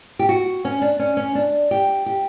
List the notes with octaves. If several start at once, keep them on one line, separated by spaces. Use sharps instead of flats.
G4
F#4
C#4
D4
C#4
C#4
D4
G4
G4